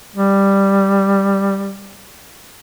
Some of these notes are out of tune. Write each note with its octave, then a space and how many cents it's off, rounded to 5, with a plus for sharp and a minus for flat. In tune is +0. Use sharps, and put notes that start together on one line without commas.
G3 +5